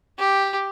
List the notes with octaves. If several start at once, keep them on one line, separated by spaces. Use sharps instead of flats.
G4